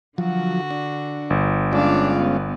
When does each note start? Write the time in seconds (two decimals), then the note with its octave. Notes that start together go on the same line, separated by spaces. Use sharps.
0.18 D3 F3 F#3 F#4
0.71 D4
1.30 G1
1.73 G#3 C#4 D4 F4 D5 F5
2.16 B3